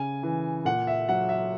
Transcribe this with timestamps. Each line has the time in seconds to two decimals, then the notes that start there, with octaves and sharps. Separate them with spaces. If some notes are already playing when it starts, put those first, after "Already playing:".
Already playing: C#3 G#5
0.23 E3
0.65 A#2 F#5
0.87 E5
1.09 F#3 F#5
1.29 E5